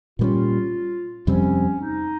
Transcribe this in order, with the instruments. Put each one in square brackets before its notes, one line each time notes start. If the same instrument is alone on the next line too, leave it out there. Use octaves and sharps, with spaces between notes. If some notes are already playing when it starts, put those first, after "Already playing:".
[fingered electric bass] A#2 G3 A#3 C#4 [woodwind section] F4
[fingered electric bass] F2 C3 G3 C4 [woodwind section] C#4
[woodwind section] D#4